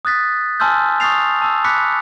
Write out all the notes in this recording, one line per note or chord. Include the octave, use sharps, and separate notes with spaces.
D#6 F#6 A6 B6
G#5 A5 C6 E6 F6 G6
C#6 D#6 G6 A6 C7 F7
A5 E6
B5 D6 F#6 B6 C#7